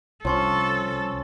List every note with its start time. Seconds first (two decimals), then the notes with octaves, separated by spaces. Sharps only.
0.25 C2 F3 C#4 A4 C#5 C6 C#6